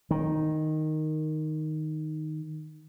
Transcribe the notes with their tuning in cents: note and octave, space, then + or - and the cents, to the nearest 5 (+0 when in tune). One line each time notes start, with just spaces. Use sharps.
D#3 -5